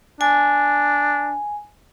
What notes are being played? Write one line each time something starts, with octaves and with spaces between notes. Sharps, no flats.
D4 G#5